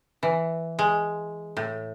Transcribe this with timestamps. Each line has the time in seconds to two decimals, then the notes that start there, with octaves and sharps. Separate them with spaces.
0.23 E3
0.79 G#3
1.57 A2